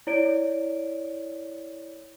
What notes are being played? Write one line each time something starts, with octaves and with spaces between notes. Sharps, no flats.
E4 C#5 D5 D7